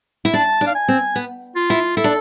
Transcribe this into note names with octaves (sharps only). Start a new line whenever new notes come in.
E4
D4 A5
D4
F5
G#5
C4
B3
F4
E4
E4 A4
D4